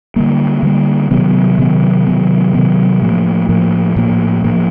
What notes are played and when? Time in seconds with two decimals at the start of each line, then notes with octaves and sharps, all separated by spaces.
0.16 D3 G3 A#3
0.63 D3 G3 A#3
1.11 C3 D#3 F#3 B3
1.59 C3 D#3 F#3 B3
2.06 C3 D#3 F#3 B3
2.54 C3 D#3 F#3 B3
3.02 A2 F3 A#3
3.49 A2 F3 A#3
3.96 A2 F3 A#3
4.44 A2 F3 A#3